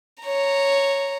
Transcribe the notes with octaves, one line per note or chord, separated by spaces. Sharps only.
C#5 A#5